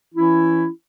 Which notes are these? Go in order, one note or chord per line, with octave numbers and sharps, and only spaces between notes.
E3 C#4 E4